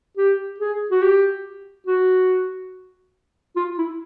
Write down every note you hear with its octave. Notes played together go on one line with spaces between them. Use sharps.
G4
G#4
F#4
G4
F#4
F4
E4